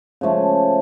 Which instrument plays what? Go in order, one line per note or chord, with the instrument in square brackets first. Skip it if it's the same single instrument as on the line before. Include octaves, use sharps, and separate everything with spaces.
[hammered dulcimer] C#3 F3 A3